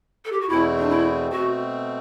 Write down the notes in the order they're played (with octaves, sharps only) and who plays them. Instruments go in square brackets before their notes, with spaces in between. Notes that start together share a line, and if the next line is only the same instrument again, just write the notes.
[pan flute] A4
G4
F#4
[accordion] E2 B2 A3 C4 [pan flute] E4
[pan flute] D4
E4
[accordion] B2 A3 C4 [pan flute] F#4